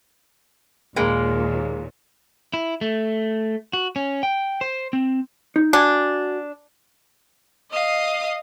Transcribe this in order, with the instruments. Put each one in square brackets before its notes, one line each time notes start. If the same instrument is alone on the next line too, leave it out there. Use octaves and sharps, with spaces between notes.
[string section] D#2 A#2 [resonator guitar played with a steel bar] G#3 A#3
[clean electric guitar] E4
A3
F#4
C#4
G5
C5
C4
[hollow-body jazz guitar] D#4
[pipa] D4 [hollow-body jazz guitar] F#4 G#5
[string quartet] D#5 F5 D#6